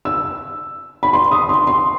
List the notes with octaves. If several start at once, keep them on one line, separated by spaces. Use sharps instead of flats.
E6
B5
C6
D#6
C6
C6